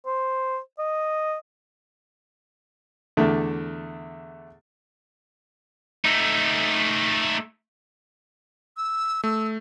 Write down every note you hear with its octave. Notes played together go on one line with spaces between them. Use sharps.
C5
D#5
E2 D3 A3
A3 D#4
E6
A3 E6